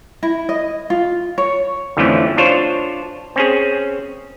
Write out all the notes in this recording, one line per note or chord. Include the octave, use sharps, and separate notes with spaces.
E4
D#5
F4
C#5
F2 D3 E3 F3 A3 C#4
D4 F4 C5 C#5
C4 C#4 G#4